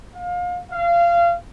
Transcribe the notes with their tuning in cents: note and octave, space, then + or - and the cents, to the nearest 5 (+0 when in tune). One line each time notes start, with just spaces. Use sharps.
F5 +30
F5 -25